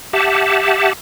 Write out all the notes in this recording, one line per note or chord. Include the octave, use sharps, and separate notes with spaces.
G4 E5 F#5 A5